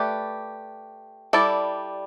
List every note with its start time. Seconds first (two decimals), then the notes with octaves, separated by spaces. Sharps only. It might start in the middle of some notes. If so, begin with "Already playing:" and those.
Already playing: A3 G4 B4 D5
1.33 G3 E4 A4 D5